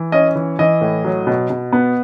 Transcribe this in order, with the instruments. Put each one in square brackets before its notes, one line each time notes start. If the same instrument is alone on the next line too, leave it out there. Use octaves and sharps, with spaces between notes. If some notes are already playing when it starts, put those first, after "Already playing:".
Already playing: [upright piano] E3
C#4 D#5
E3
E3 D#5
A2
F#3
B2
B2
B3